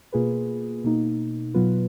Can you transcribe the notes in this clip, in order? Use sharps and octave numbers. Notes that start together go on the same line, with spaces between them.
B2 A#3 F4 G#4 B4
B2 A#3 D#4
B2 F#3 B3 F4 B4